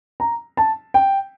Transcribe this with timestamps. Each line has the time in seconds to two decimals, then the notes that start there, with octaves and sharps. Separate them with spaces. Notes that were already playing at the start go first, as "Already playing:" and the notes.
0.20 A#5
0.57 A5
0.94 G5